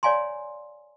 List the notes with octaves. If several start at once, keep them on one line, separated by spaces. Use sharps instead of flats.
C#5 D5 F5 G#5 A#5 C6